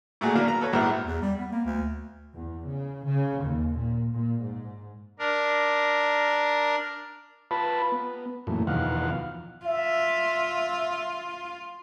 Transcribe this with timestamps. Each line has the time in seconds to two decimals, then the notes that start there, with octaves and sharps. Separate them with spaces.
0.21 A#2 A3 F#4 G#4
0.35 F#3 A#3 B3 D4 F5
0.48 A#5
0.61 A4 B4 C#5
0.73 A#1 G#2 F#3 E4 F6
1.05 E2
1.22 G3
1.39 B3
1.52 A#3
1.65 D2
2.35 E2
2.66 C#3
3.05 C#3
3.43 D#2
3.76 A#2
4.12 A#2
4.42 G#2
5.19 D4 A#4
7.51 F4 B4 A5 B5
7.92 B3
8.47 F#2 A#2 E3 A3
8.67 E2 B2 D#3 F3 F5 F#5
9.65 F4 E5